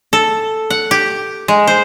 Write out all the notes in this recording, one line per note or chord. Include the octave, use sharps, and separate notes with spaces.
A4
F#5
G4
G#3
C5